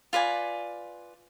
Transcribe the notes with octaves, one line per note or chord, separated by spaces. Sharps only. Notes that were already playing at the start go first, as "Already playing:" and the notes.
F4 B4 D5 G#5